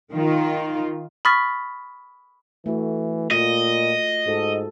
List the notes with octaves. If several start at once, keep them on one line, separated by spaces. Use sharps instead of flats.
D#3 F4
B5 C#6 D#6 F6 A6 B6
E3 A3 E4 F#4
A#2 F4 D#5
G#2 F#4 A4